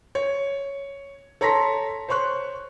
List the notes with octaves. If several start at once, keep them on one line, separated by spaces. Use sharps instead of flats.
C#5
A4 C#5 A#5 C6 A#6 B6
C5 C#5 C6 C#6 F#6